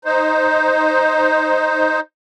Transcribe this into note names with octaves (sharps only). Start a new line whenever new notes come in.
D#4 C5